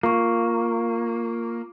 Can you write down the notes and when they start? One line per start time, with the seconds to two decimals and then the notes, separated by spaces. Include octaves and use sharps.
0.03 A#3 F4 C#6